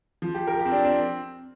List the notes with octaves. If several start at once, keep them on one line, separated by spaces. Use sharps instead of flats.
F3
G4
A#4
G4
C4
D4
C4